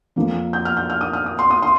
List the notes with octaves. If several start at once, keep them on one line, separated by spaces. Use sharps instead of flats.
F2 F3 A#3
G6
F6
G6
F6
D#6
F6
D#6
C6
D#6
C6